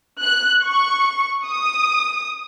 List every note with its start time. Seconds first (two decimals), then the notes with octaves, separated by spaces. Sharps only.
0.22 F#6
0.64 C#6
1.46 D#6